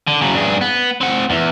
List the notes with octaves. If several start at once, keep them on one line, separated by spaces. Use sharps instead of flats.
D3
C#3 F#3
G2 G#4
B3
C4 F#5
E2